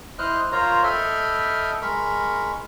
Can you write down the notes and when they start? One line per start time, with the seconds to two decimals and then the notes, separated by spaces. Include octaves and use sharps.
0.19 E4 C5 D#5 F6 F#6
0.52 F4 A#4 C5 C#5 A#5
0.84 A4 D#5 E5 G5 B5 F6
1.82 G#3 A#4 B5 C#6